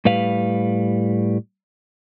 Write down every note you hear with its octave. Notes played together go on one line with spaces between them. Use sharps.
A2 G3 B4 F5